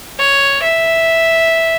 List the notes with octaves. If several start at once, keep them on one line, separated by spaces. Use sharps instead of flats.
C#5
E5